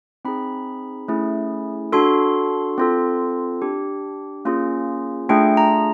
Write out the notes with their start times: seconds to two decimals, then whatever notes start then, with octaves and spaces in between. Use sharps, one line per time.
0.25 C4 D#4 G#4 B5
1.08 A3 C#4 E4 G#4
1.93 D4 F#4 A4 C6
2.78 C4 F4 A4
3.62 D4 G4
4.45 A#3 C#4 F4 G#4
5.29 A3 D4 F4 G#4 G5
5.57 A#5